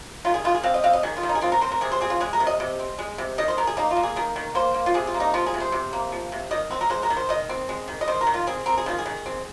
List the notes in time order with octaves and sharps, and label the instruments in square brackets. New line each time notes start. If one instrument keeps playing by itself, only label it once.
[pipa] D#3 F4
G#4
D#3 F4
G#4
C4 F5
D#5
C4 F5
D#5
D#3 G#4
F4
D#3
D#4
G#4
C4 F4
A#4
C4 C5
A#4
C3 G#4
C5
C4 G#4
F4
G#3 G#4
A#4
C3
D#5
C3
C4
G#3
C3
D#3 D#5
C5
D#3 A#4
G#4
A#3 D#4
F4
A#3
G#4
D#3 A#4
D#3
A#3 C5
A#3
F4
C3 G#4
F4
A#3
D#4
F3 F4
G#4
C3
C5
C3
A#3
F3
C3
D#3 D#5
C4
A#4
G#3 C5
A#4
D#3
C5
D#3 D#5
C4
G#3
D#3
D#5
D#3 C5
A#4
D#3
F4
C4 G#4
C4 A#4
G#4
D#3 F4
G#4
D#3
C4